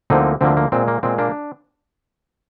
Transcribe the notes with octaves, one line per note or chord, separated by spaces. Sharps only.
D2 D3 F3 A#3 C4 D#4
D2 D3 F3 A#3 C4
A#3
A#2 G#3 C4
A#3
A#2 G#3 C4
A#3 D4